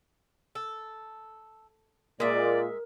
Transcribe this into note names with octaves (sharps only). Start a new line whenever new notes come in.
A4
A#2 G#3 A#4 D5 E5